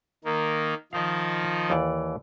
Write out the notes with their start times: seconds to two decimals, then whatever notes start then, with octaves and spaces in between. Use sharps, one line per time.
0.25 D#3 A#3
0.93 D#3 F3 D#4 D#5 F5
1.70 D#2 E3 D5